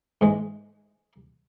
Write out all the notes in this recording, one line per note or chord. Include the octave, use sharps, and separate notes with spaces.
G#2 E3 G#3